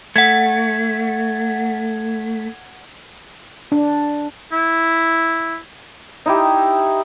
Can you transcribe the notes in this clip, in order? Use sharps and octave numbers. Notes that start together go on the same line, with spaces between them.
A3 F#5 G#6
D4
E4
D#4 E4 G4